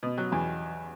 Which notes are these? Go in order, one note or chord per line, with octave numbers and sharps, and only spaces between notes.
B2
F#3
E2